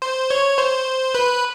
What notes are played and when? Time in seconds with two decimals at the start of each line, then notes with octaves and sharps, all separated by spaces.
0.02 C5
0.30 C#5
0.58 C5
1.15 B4